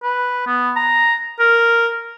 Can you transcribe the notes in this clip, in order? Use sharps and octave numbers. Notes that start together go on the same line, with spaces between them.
B4
B3
A#5
A#4